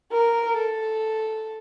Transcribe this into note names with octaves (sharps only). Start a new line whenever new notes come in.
A#4
A4